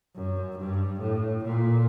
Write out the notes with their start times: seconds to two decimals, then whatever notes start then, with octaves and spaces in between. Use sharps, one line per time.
0.16 F#2
0.59 G2
1.01 A2
1.44 A#2